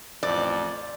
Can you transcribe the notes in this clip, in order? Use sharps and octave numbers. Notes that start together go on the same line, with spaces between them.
A1 F2 D5